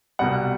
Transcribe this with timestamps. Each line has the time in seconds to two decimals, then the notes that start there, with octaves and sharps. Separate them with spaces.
0.19 C2 B2 G3 F#5